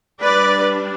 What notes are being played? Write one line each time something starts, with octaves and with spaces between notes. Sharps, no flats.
G3 D4 B4 D5